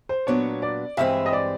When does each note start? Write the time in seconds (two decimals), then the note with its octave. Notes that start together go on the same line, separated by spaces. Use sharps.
0.09 C5
0.27 A#2 F#3 B3 D4 C#5
0.62 D5
0.97 G2 E3 G#3 C4 E5
1.26 D#5
1.33 D5